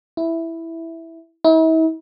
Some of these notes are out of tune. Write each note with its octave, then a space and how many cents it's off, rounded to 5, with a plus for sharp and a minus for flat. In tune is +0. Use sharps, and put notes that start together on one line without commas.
E4 +0
E4 -45